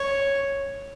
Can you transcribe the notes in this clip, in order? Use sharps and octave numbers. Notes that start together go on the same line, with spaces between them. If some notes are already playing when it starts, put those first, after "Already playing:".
Already playing: C#5